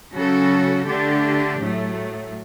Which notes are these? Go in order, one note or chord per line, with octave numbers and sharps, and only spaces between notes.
C#3 F#3 C#4 F#4 A4
D3 A3 D4 G4
A2 F#3 A3